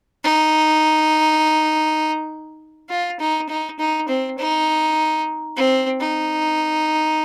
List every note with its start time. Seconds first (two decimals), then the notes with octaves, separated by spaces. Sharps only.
0.23 D#4
2.89 F4
3.20 D#4
3.49 D#4
3.79 D#4
4.08 C4
4.38 D#4
5.56 C4
6.00 D#4